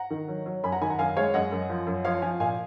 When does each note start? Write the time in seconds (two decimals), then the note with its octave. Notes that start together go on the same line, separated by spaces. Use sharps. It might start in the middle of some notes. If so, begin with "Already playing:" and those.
Already playing: F#5 A#5
0.11 D#3
0.28 F#3
0.46 F#3
0.63 F#2 G#5 B5
0.72 F#5 A#5
0.81 D#3 G#5 B5
0.90 F#5 A#5
0.99 F#2 F5 G#5
1.16 G#3 C#5 F5
1.34 F#2 D#5 F#5
1.52 F#2
1.70 F3
1.87 F#2
2.05 F3 C#5 F5
2.22 F3 F5 G#5
2.40 A#2 F5 G#5